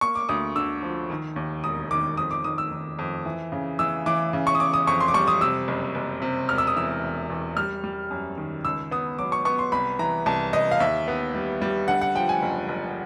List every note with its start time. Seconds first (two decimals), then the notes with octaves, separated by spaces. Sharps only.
0.01 A#3 C#6
0.15 D6
0.29 D2 D#6
0.56 D3 E6
0.82 F3
1.10 D#3
1.36 D#2
1.63 E1 D#6
1.91 D#3 D6
2.17 F2 D#6
2.31 D6
2.44 D#3 D#6
2.58 E6
2.72 D#3
2.99 F2
3.25 E3
3.52 C#3
3.79 E3 E6
4.06 E3 D6
4.33 C#3
4.47 C#6
4.55 D#6
4.60 C#3 D6
4.74 D#6
4.87 F2 C#6
5.01 C6
5.08 D6
5.14 G3 C#6
5.28 D#6
5.41 C3 E6
5.68 F#1
5.95 F#1
6.22 C3
6.49 E1 F6
6.58 E6
6.67 D#6
6.76 E3 E6
7.03 E1
7.30 E2
7.57 G3 F6
7.84 G3
8.11 F#2
8.38 D#3
8.65 C#2 E6
8.91 B3 D#6
9.19 F#3 D6
9.32 C#6
9.45 B3 C#6
9.59 C6
9.72 C2 B5
9.99 E3 A#5
10.26 C2 A5
10.53 C2 D#5
10.71 F5
10.80 D#2 E5
11.08 B3
11.35 G3
11.62 G3
11.88 D3 F#5
12.01 F#5
12.15 F3 G5
12.29 G#5
12.42 F#1
12.69 F#1